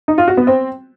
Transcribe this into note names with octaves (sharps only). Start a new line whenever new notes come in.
D#4
F4
F#4
B3
C4